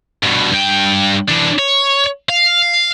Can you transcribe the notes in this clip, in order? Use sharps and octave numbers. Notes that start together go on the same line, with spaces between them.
G2 B2
G2 G5
E3 D4
C#5
F5